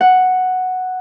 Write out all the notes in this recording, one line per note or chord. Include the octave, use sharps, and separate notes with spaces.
F#5